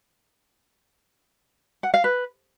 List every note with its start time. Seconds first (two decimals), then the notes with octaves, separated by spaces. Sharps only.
1.83 F#5
1.94 F5
2.04 B4